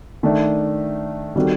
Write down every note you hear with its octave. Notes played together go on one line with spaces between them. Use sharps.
D#3 A3 D4
D#3 G3 C4 F#4 A4